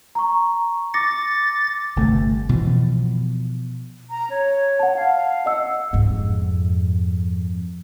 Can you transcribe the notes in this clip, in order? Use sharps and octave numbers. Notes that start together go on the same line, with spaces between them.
A#5 C#6
D6 A6 A#6 C#7
G1 C3 A3
B2 E3 F3
A#5
C#5
F#5 A5
F5
D#5 F#5 E6
F2 G#2